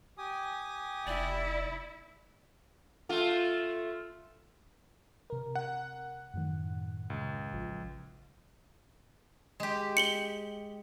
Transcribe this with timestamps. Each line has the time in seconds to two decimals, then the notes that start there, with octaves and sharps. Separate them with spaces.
0.18 G4 G#5 D#6
1.07 F1 E4 D5
3.09 A3 F4
5.30 C3 A#4
5.55 F#5
6.34 F#2 A2 D#3
7.10 C#2
7.53 A1 F3
9.60 G#3 G4
9.97 C#7 F#7 G7